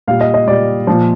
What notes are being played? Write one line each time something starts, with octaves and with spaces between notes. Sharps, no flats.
A#2 G3 F5
D#5
D#5
A#2 G3 D5
A#2 F3 C5